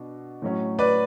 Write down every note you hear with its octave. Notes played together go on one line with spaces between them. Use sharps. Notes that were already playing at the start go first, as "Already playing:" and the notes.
Already playing: B2 D4
A2 F#3 C#4
B4 D5